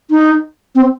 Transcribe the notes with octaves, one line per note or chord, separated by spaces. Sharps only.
D#4
C4